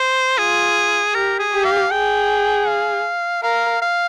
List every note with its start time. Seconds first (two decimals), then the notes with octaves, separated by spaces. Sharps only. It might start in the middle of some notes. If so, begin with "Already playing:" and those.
Already playing: C5
0.38 F4 G#4
1.14 G4 A#4
1.39 G#4
1.52 G4
1.65 F5
1.91 G#4 G5
2.67 F5
3.43 A#4 F5
3.82 F5